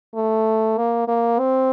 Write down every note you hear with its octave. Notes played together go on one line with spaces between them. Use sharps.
A3
A#3
A#3
C4